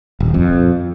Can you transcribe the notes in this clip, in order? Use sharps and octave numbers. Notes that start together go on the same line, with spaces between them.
D#1
F2